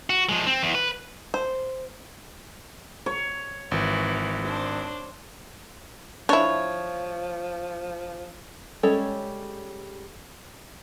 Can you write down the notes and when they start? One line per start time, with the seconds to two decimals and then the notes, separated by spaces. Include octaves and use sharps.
0.10 F#4
0.29 F3 G#3
0.47 C4
0.63 E2
0.75 B4
1.34 C5
3.06 C#5
3.71 G#1 E3
4.46 D4 C5
6.29 F3 D4 E4 C#5
8.83 G3 G#3 C#4 A4 C#5